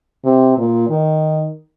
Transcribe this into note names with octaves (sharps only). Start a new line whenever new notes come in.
C3
A#2
D#3